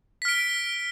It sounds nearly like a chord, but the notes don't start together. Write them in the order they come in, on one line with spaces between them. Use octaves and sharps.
B6 F6 D7